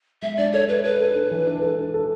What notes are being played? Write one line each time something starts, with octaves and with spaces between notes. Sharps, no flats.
G#3 E5
D4 D5
A4 C#5
A4 B4
A4 B4
A4
D4
E3
D4
A4
D4
A4